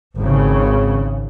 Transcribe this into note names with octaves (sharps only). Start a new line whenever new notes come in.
G#1 C#3